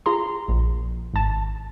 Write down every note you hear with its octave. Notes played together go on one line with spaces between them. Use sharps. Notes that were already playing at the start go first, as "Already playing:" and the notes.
F4 G#4 A#5 C6
A#1
G#1 A5